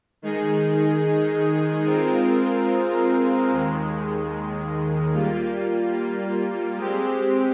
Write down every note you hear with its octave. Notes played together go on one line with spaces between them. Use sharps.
D#3 G#3 D#4 G#4
G#3 C4 F4 A#4
D#2 D#3 G#3
G3 A#3 F4
G#3 C4 G4